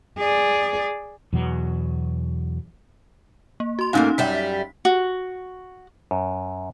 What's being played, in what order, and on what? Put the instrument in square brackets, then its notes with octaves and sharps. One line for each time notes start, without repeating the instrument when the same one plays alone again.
[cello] G#4 D5
[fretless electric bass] E2 B2 F#3
[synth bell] A#3
F#4 C6
[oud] G#2 A3 A#3 [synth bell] C#4 D#4 F5
[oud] F#2 G3 E5 [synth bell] B6
[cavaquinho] F#4
[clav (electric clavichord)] F#2